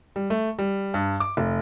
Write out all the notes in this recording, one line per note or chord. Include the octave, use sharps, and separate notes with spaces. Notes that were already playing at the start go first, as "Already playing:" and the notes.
G3
A3
G3
G2
D6
F1